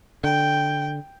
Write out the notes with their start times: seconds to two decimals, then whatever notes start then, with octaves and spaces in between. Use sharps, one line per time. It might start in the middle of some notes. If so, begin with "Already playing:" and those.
0.24 D3 G5